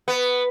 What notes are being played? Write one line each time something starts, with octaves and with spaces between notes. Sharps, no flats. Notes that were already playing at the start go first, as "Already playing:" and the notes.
B3